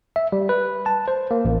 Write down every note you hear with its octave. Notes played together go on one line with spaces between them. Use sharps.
E5
G3
B4
A5
C5
A#3
A1